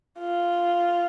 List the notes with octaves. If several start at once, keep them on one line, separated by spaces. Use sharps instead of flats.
F4